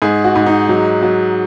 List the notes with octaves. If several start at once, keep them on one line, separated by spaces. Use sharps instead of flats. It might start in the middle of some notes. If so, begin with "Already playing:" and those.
G#2 G#4
F#4
G#2
D#4
F#3
F#3